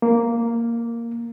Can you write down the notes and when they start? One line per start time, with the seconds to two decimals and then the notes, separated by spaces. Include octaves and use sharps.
0.02 A#3